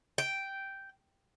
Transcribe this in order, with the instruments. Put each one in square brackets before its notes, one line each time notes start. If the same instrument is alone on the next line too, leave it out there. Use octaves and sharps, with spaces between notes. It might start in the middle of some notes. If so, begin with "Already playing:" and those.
[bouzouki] G5